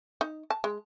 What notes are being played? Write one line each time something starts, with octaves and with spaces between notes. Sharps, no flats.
D#4
A5
G#3